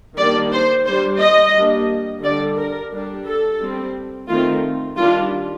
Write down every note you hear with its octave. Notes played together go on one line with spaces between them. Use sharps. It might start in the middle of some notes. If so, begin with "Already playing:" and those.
D#3 G3 A#3 D4 D5
C5
G3 D4 C5
D#5
G3 A#3 D4
D3 G3 D4 D5
A#4
G3 D4
A4
G3 C4
D#3 A3 C4 F4
D#3 G3 D4 F4